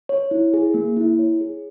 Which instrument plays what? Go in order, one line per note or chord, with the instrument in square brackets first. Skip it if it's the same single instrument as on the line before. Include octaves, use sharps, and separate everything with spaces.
[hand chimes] C#5
E4
G#4
A#3
E4
C#5
G#4